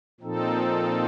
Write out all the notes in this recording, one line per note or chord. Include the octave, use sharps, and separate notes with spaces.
A#2 F3 C4 D#4 A4